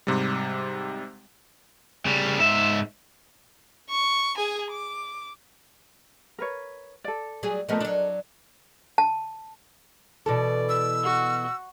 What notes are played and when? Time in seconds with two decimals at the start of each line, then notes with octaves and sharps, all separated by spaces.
0.07 G#2 C3 G3
2.06 C#3 G3
2.39 G#2 E5
3.90 C#6
4.37 G#4 G#5
4.71 D6
6.38 A#4 B4 C#5
7.04 A4 D5
7.43 F#3 G3 G#4
7.69 F3 A3 B3 A4 A#4 D#5
7.81 F#3 D4
8.98 A5
10.26 B2 E3 A4 D5
10.69 E6
11.03 F#4